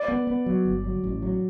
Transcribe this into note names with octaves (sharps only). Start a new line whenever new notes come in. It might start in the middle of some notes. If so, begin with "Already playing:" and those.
Already playing: D5
B3
B3
F#3
G1
F#3
A1
F#3